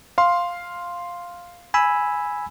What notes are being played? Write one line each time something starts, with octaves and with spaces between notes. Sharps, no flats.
F5 C6
G#5 B5 E6